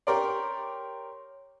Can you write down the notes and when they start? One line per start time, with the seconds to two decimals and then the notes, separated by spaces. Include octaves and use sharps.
0.07 G4 A#4 C#5 D5 C6 C#6